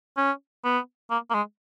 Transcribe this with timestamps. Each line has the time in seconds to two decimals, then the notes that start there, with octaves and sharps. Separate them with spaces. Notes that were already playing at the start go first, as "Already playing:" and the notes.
0.17 C#4
0.64 B3
1.11 A#3
1.30 A#3
1.35 G#3